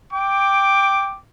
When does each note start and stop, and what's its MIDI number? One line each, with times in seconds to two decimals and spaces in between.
0.13 1.18 79
0.13 1.18 86